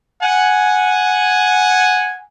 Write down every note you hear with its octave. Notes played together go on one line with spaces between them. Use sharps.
F#5 G#5